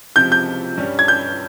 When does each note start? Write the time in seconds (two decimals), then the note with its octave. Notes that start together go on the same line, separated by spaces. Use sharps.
0.16 C#2 C3 F3 C4 F4 G6
0.32 G6
0.78 G2 G3 C#4 G4
0.99 G#6
1.08 G6